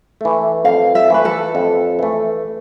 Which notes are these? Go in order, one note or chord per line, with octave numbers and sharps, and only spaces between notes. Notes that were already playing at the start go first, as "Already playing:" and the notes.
E3 A3
F2 F5
E5
E3 A3 B4
A4
F2
E3 A3